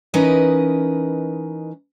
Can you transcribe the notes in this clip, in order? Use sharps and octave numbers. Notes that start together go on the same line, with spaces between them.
E3 C#4 D#4 A#4 B4 D#5